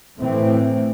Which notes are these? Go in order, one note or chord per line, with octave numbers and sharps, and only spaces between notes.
A2 E3 A3 C4